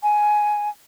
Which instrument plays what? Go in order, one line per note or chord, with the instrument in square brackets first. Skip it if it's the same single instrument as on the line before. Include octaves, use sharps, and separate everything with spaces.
[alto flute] G#5